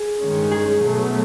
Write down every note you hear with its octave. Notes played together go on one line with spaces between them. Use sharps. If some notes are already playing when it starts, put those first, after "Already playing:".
Already playing: G#4
G2 D#3 G#3 C#4
G#4
B2 F#3 A3